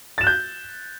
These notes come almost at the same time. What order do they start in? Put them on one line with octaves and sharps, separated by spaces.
A6 E7 F#6 G6